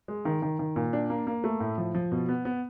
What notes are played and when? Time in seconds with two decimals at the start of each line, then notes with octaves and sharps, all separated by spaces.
0.08 G#3
0.25 D#3
0.42 D#3
0.59 D#3
0.76 A#2
0.93 D4
1.10 A#3
1.27 A#3
1.44 A3
1.60 A2
1.78 F3
1.94 F3
2.12 B2
2.29 B3
2.45 B3